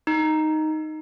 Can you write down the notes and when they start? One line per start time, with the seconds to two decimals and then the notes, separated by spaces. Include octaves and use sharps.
0.07 D#4